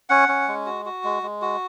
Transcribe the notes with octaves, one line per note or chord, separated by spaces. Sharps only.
C#4 F#5
C#4
G#3
F#4
F#4
G#3
G#3
F#4